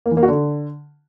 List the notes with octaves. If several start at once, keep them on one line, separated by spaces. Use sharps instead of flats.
A#3
E3
A#3
F#4
D3